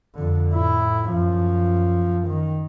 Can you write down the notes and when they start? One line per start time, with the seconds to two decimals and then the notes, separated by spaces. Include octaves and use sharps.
0.15 F2 D3
0.52 A2 E4
1.11 F#2 F3
2.28 D#3